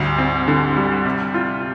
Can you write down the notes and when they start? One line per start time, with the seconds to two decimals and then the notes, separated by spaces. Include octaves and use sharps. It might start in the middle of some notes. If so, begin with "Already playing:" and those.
Already playing: D2 G#2 G3
0.18 C4
0.48 D3
0.76 G3
1.05 C3
1.34 F4